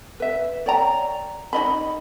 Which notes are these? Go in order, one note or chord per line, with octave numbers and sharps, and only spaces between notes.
B4 E5
C#5 D5 G5 A#5
D#4 C#5 D#5 B5